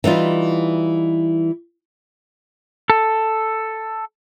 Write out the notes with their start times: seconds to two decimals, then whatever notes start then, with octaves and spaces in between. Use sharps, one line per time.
0.04 E3 G3 D#4 F4
2.90 A4